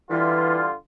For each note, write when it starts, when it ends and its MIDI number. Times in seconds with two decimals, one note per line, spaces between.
0.10 0.73 50
0.10 0.61 52
0.10 0.73 55
0.10 0.73 65